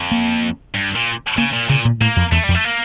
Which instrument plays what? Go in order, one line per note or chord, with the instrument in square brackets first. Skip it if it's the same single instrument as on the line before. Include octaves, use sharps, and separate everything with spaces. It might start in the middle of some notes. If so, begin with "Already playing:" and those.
Already playing: [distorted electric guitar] F2
[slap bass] A#3
[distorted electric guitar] G2
A#2
[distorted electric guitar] C#3 [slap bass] A#3
[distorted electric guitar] A#2
[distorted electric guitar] A#2 [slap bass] C#3
[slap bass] A#2
[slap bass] A2 [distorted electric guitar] A#3
[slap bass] F2
[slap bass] E2 [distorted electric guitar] A3
[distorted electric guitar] G3
[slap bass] F2
[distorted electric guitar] A3
A#3